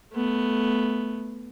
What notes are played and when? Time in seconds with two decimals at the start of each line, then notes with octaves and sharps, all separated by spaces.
0.14 A3 B3